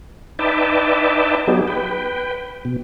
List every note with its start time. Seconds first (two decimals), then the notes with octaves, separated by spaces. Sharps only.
0.39 D#4 B4 D5 E5 G5 A5
1.48 F#3 B3 D#4 G4 G#4
1.67 B4 G5
2.65 B2